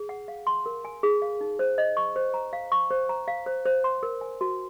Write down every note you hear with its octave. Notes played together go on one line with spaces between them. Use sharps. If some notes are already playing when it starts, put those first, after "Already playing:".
Already playing: G#4
F#5
F5
C6
A#4
G#5
G#4
F5
D#4
C5
D#5
C#6
C5
A#5
F5
C#6
C5
A#5
F5
C5
C5
C6
A#4
G#5
F#4